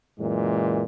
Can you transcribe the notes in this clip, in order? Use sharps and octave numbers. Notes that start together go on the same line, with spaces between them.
F#2 A#2 E3 G#3